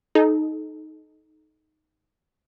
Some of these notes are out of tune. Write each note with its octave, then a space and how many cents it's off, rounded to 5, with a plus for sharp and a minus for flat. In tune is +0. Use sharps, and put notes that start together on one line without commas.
D#4 +0 A4 -35